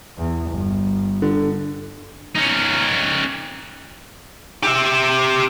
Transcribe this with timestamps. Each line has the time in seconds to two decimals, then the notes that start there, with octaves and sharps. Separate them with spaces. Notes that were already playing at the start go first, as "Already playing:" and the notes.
0.18 E2
0.50 G1
1.22 D3
2.35 C#4 D#4
4.63 G4 E5